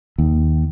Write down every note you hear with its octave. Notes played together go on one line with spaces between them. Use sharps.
D#2